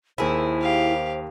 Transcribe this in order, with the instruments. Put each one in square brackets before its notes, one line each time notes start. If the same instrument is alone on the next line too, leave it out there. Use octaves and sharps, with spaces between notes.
[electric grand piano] D#2 A#4 B5 [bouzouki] E4 G#4 [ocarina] C5
[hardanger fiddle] G4 F5